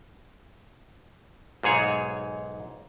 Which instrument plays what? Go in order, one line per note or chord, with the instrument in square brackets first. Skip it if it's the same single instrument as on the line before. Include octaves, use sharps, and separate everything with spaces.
[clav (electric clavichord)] B1 G#2 G#4 C#5